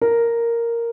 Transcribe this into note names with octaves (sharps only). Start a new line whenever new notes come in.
A#4